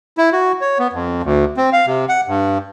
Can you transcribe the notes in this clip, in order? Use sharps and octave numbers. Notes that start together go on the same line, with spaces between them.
E4
F#4
C#5
B3
F2
D2
C4
F5
C3
F#5
G2